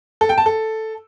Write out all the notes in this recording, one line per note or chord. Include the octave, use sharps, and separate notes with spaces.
A4
G5
A5
A4